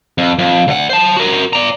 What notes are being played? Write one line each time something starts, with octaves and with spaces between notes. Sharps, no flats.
F2
F2
D2 F#5
C5 A5
F#4 A#4
D5 A#5